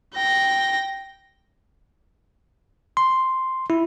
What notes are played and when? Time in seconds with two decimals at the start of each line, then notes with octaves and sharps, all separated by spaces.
0.15 G5 A#6
2.97 C6
3.70 E4